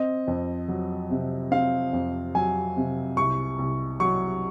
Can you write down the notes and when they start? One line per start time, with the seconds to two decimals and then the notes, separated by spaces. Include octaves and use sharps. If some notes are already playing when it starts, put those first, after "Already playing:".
Already playing: C4 D#5
0.27 F2
0.68 F#3
1.10 C3
1.51 C4 F5
1.93 F2
2.35 F#3 G#5
2.76 C3
3.17 C2 C#6
3.59 C2
4.00 F#3 C#6